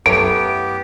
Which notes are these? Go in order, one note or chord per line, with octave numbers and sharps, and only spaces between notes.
F#2 E3 A3 B3 G4 C#5 D7